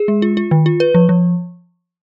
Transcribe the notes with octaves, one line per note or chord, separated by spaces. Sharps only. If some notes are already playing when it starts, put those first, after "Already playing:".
Already playing: G#4
G#3
F4
F4
D#3
F4
B4
F3
F3